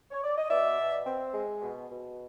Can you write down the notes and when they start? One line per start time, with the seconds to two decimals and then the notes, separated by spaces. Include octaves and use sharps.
0.11 C#5
0.24 D5
0.37 D#5
0.50 B2 D5 E5
0.78 B2
1.06 C4
1.34 G#3
1.62 B2
1.89 B2